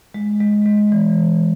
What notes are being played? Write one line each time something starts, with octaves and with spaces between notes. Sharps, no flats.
G#3
G#3
G#3
E3
E3